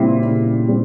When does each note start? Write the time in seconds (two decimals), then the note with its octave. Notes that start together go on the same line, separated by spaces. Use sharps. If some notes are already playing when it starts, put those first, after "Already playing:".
Already playing: A#2 C#3 G3 C4 E4 G4
0.27 C#3
0.68 G3 C4